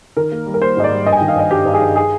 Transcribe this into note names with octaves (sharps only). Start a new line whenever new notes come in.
D#3 A#4
A#3
G3
A#4
A#3 C5
G#2 D#5
D5
G3
G2 D#5
G#5
D#3 G5
F5
G2 D#5
G2 G4
G2
G#4
G2
G#4